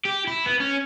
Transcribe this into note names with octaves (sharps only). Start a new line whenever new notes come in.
G4
E4
B3
C#4